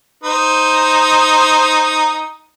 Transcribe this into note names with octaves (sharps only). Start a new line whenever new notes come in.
D#4 C5